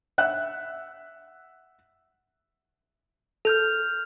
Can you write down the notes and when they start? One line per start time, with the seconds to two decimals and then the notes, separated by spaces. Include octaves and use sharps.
0.18 E5 F#5 F#6
3.45 A4 F6 G6 F7